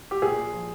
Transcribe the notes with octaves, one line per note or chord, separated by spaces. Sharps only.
G4
A#2 G#4
F3